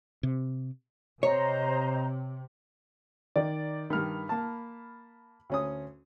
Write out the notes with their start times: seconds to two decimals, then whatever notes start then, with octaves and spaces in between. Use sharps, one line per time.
0.23 C3
1.23 C3 C5 C#5 D#5 A#5
3.36 D#3 D5
3.90 G2 D#3 B5 F6
4.29 A#3 A5
5.50 D2 C#4 D#6